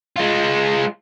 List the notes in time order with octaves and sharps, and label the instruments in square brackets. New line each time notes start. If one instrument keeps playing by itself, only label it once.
[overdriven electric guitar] G#3 F4